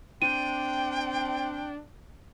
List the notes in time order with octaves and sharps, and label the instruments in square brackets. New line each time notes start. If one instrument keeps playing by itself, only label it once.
[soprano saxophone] C4 [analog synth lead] D4 [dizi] G5 [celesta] D#7